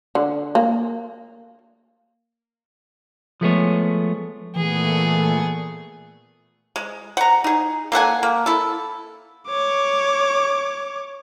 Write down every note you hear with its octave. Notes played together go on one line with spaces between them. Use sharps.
D3
A#3
F3 G#3 A3 B3 G#4 C#5
A#2 E3 A3 B3 G#4
G#3
F#5 A#5
D#4 G#4
A#3 A4 F#5 G#5
A#3
E4 A4
C#5 D6